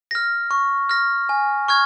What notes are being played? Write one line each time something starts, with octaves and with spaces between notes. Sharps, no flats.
F6 A#6
C#6
F6 A#6
G#5
C#6 F6 G#6